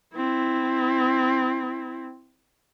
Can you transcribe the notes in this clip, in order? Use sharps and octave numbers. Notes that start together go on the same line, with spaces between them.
C4 E4